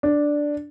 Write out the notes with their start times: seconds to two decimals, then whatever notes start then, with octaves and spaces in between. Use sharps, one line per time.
0.03 D4